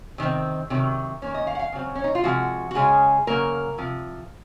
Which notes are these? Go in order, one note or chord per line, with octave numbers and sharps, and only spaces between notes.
C3 D#3 C4
C3 D#3 F#3
D#3 A#3 C#4
D#5
F5
F#5
F5
C#3 F#3 C4
C#4
D#4
F4
C3 F3 G#3 F#4
F#4
C#3 G#3 C#4 G#4
C#3 F#3 A#3 A#4
C3 F3